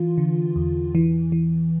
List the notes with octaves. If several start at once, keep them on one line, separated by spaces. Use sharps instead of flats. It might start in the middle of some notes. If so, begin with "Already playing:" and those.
Already playing: E3 F4
D3
E2
E3
E3